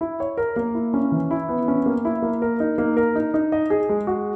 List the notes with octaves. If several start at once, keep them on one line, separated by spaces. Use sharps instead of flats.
E4
C#5
A#4
A#3
E4
C#4
E3
E4
B3
C#4
A#3
E4
A#3
A#4
D#4
A#3
A#4
D#4
D#4
D#5
G#4
G#3
F#4